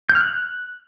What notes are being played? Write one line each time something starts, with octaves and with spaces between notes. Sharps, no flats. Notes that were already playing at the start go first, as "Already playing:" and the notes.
G6
F6
F#6